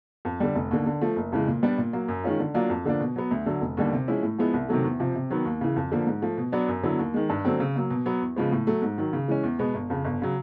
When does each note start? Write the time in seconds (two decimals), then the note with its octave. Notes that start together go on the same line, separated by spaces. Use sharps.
0.25 F2
0.40 D3 G3
0.55 F1
0.71 D#2 D3
0.86 D3
1.01 F3 A3
1.16 F#1
1.32 F2 C#3 E3 G#3
1.48 A#2
1.63 G3 B3 D4
1.78 A#2
1.93 F#3 A#3
2.08 F#2
2.24 D#3 G#3 C#4 F4
2.39 D3
2.54 F#3 A#3 D4 F4
2.70 F2
2.86 D3 F3 A#3 D4
3.00 B2
3.16 F#3 B3
3.31 D2
3.46 D3 F#3
3.62 F1
3.77 D#2 D3 G3
3.93 C3
4.08 F3 G#3 C#4 E4
4.23 A2
4.38 F3 G#3 B3 E4
4.54 C2
4.69 C3 D#3 F#3 A3
4.84 E2
5.00 C3 F3
5.15 C3
5.30 D#3 F#3 B3
5.45 D#2
5.61 C#3 E3
5.76 F2
5.92 D3 F3 A#3
6.07 G#2
6.22 F3 A3
6.37 B2
6.52 F#3 B3 D4
6.68 F#2
6.83 D3 F#3 B3 E4
6.99 D#2
7.14 D#3 G#3
7.29 G2
7.45 D3 F#3 A3 C4
7.60 C#3
7.76 F#3 A#3
7.90 B2
8.06 F#3 B3
8.21 E2
8.36 C#3 F3 G#3 B3
8.52 A2
8.67 F#3 A3
8.82 G#2
8.98 D#3 F#3
9.13 C#3
9.28 E3 G#3 C#4
9.43 E2
9.59 B2 G#3 B3
9.74 G1
9.90 F2 C#3
10.04 G1
10.22 C#3 F#3